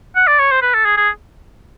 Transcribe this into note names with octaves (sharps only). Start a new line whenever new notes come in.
F#5
D5
C#5
C5
B4
A4
G#4
G#4